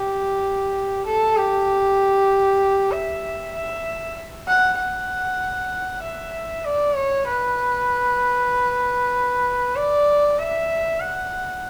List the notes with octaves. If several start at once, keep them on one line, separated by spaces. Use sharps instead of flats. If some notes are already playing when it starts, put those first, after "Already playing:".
Already playing: G4
A4
G4
E5
E5
F#5
F#5
E5
D5
C#5
B4
D5
E5
F#5